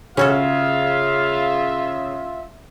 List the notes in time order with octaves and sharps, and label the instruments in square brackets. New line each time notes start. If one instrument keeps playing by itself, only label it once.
[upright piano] C#3 [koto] C#4 F#4 A4 [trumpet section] F4 E5 [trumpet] F5